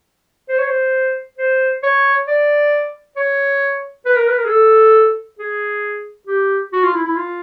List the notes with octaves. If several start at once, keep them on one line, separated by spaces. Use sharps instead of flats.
C5
C#5
C5
C5
C#5
D5
C#5
B4
A#4
B4
A#4
G#4
A4
G#4
G4
F#4
F4
E4
E4
F4